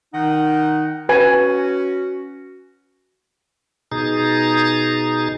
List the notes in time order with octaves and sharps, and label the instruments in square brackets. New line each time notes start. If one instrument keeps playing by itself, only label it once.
[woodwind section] D#3 D#4 F#5
[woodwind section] C#4 F#4 [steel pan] B4 G#5
[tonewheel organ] B2 D#4 G#4 A#5 A6